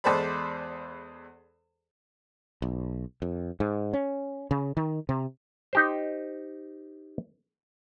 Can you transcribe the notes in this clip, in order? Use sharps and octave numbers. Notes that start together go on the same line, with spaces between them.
E2 G#3 A4 C5 D5 B5
B1
F2
G#2
C#4
C#3
D#3
C3
D#4 G4 C5